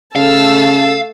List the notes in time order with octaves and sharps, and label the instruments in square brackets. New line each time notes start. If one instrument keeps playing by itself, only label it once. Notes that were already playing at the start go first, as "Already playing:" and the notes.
[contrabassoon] C#3 [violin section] A3 A5 E6 [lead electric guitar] F5